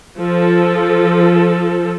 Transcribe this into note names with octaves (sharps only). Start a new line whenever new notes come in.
F3 A4